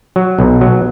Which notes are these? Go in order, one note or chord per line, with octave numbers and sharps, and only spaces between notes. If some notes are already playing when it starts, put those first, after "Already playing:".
F#3
B1
F#3